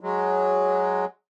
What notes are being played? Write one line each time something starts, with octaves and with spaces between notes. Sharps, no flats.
F#3 G#3